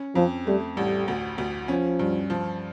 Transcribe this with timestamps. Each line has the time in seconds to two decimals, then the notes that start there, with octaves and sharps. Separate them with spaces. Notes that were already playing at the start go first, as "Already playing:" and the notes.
Already playing: C#4
0.15 F2 F3
0.47 G3 A3
0.77 A1 G3
1.08 D2
1.38 D2
1.68 F3 C#4
1.99 G2
2.30 F3